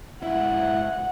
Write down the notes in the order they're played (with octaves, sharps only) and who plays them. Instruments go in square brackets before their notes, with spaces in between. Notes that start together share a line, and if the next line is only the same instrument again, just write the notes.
[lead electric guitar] G#2 E4 [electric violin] F#5